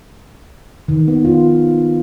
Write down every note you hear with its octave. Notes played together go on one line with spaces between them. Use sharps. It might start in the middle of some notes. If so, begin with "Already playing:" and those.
D#3
B3
F4